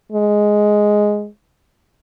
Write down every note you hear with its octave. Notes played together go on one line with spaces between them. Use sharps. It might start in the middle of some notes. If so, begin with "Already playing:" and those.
G#3